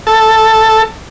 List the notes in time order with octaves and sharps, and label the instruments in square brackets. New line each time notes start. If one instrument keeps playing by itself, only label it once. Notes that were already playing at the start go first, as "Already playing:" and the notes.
[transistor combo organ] A4